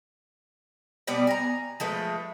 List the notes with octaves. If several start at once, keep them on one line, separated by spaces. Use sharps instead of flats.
B2 G3 B3 D5
G#5 A#5
F3 G#3 A3 B4